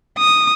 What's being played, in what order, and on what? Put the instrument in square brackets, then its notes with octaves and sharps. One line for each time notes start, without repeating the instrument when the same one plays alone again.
[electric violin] D#6